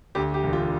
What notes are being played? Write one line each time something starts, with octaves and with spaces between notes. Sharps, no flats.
D2 G4
G4
E1
F4